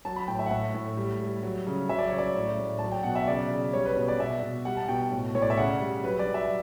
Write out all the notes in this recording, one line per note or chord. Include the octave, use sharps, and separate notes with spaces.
F#3 A5
B5
A2 G5
E5
F#5
A2 E5
A2
G3
G3
F#3
C#3
F#3 E5
D5
C#3 C#5
D5
A2
A2
F#3 A5
G5
B2 F#5
E5
C#3 D5
C#3
G3 C#5
B4
B2 B4
D5
B2 E5
B2
G3 F#5
A5
B2 G5
A2
A2 C#5
D5
E5
C#3 F#5
G3
F#3 B4
D5
F#3
E5